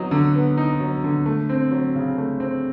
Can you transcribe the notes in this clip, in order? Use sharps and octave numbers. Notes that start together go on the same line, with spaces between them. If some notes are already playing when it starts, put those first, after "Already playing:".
Already playing: F#3 B3 D#4
D3
B3
D#4
F#3
D3
A3
C4
F#3
C#3
A3
C4